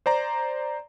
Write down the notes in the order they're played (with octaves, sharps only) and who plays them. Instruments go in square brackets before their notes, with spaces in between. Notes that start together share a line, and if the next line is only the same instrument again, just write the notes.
[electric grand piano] C5 D5 A#5